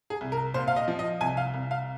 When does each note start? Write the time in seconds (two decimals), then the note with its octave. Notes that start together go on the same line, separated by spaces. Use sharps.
0.10 G#4
0.21 C2
0.32 A#4
0.54 A#2 C5
0.68 F5
0.76 D#5
0.88 F3
0.99 D#5
1.21 C2 G#5
1.37 F5
1.54 C2
1.71 F5